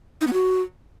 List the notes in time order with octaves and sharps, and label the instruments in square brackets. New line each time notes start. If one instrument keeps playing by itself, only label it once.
[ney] D#4
B3
F#4